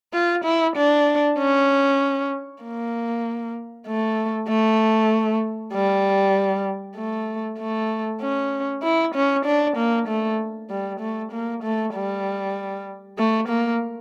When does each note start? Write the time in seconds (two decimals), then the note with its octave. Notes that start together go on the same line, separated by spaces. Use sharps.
0.13 F4
0.45 E4
0.76 D4
1.38 C#4
2.63 A#3
3.87 A3
4.48 A3
5.73 G3
6.97 A3
7.59 A3
8.21 C#4
8.83 E4
9.15 C#4
9.46 D4
9.77 A#3
10.08 A3
10.70 G3
11.00 A3
11.32 A#3
11.63 A3
11.94 G3
13.18 A3
13.48 A#3